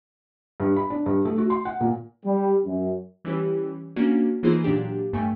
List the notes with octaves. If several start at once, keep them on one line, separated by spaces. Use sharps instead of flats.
G2
B5
D4
G2
A3
F#4
C6
F#5
A#2
G3
F#2
E3 G3 C#4 E4 G4 C#5
A#3 C#4 D4 F#4
E3 A#3 D#4 F4 G#4 C5
A#2 F#3 D4 G4
G2 A3 G5 G#5 C#6